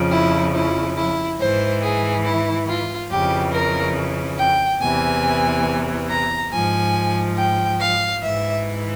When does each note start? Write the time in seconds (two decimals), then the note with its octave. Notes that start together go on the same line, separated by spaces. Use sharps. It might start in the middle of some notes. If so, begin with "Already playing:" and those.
Already playing: F2 C#3 F3
0.12 E4
0.55 E4
0.98 E4
1.40 G#2 E3 C5
1.83 G#4
2.26 E4
2.68 F4
3.11 F2 C#3 E3 G4
3.54 A#4
4.39 G5
4.82 E2 C3 E3 G#5
6.10 A#5
6.53 G#2 F3 G#5
7.38 G5
7.81 F5
8.23 G#2 E3 E5